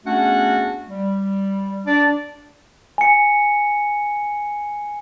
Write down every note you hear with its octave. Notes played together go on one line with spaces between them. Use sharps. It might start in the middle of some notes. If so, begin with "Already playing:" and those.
E2 A3 C#4 D4 F#4 F#5
G3
D4 D5
G#5 C#7